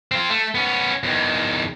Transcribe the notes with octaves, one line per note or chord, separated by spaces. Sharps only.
C4 F4
A3
B3 C#4
E2 D#3